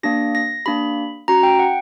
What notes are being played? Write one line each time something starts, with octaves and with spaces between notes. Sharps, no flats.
A#3 D4 G4 A#6
A#6
A#3 D4 G4 B5
C#4 F#4 A#5
G5
F#5